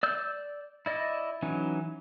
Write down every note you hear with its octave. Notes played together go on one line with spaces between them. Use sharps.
D5 E6 G6
E4 D5 D#5
E3 F#3 C#4 D#4